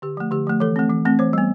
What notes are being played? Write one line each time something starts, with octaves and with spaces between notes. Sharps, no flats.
D3 G4
F3 A3
D3 G4
F3 A3
E3 A4
A3 C4
E3
A3 C4
E3 C5
G3 B3